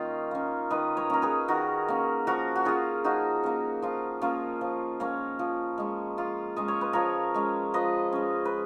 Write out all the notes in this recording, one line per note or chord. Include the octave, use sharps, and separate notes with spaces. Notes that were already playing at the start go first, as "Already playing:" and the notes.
Already playing: D#3 A#3 C#4 D#4 F4
A#3 C#4
D#3 B4 D#5
A#4 C#5
A#3 C#4 A#4
G#4 B4
D#3 F#4 A#4
A#3 C#4
F3 F#4 A#4
F#4
A#3 C#4 F4 G#4
F3 D#4 F#4
A#3 C#4
F3 F4
A#3 C#4 F4
F3
A#3 C#4
F3
G#3 C#4
F3 F4
G#3 C#4 D#5
C#5
B4
F3 A#4 C#5
G#3 C#4
F3 B4 D#5
G#3 C#4
B4